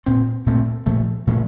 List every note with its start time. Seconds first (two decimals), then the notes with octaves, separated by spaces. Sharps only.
0.06 A#2 A3 C4
0.46 A#2 A3 C4
0.86 A#2 F3 A3
1.27 A#2 F3 A3